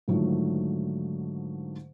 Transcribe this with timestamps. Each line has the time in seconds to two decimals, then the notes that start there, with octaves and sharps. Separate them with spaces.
0.08 G#2 D3 D#3 F3 F#3 A3